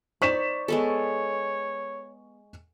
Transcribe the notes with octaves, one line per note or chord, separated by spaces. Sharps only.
D#4 C5 D5 C#6 B6 E7
G#3 B3 A4 C#5